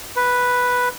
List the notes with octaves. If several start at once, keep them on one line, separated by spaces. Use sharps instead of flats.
B4